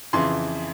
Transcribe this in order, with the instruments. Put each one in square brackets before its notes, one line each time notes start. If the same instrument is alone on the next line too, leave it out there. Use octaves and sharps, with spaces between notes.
[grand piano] F2 C#3 E3 C6